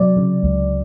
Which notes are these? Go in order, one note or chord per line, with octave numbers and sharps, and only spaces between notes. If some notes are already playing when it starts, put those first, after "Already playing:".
Already playing: C3 F#3 D5
C#3
C#2